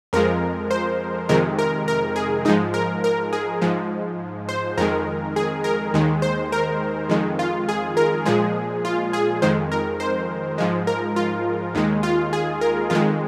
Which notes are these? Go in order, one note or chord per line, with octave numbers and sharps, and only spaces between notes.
F2 F3 G#3 A#4
C5
F2 C3 D#3 G#3 A#4
A#4
A#4
G#4
G#2 F3 G#3 D#4
A#4
A#4
G#4
G#2 F3 G#3
C5
F2 D#3 G#3 A#4
G#4
A#4
D#2 D#3 G#3
C5
A#4
F2 D#3 G#3
F4
G#4
A#4
A#2 F3 G#3 G#4
F4
G#4
F2 D#3 G#3 C5
A#4
C5
G#2 F3 G#3
A#4
F4
D#2 D#3 G#3
F4
G#4
A#4
F2 D#3 G#3 F4